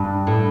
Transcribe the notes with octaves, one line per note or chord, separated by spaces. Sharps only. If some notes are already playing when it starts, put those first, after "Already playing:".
Already playing: G2
A2